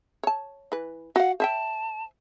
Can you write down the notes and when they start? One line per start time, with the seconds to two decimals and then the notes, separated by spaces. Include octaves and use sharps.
0.23 C#5 A5
0.72 E3 B4
1.16 F#4 F5 F#5
1.40 C5 E5 G5 A5